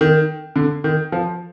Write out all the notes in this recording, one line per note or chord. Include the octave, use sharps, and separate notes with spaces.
D#3
D3
D#3
F3